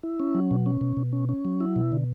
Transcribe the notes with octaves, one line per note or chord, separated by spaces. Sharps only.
E4
C#4
F#3
B2
C#4
B2
B2
C#4
C#4
F#3
E4
B2
D3